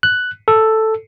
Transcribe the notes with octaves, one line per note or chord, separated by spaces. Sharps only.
F#6
A4